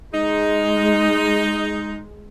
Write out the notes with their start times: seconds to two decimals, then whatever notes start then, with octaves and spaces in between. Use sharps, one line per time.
0.14 G#3 D#4